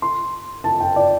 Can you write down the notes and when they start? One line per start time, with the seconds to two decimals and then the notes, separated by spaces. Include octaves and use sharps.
0.02 C6
0.64 A5
0.80 G5
0.96 D5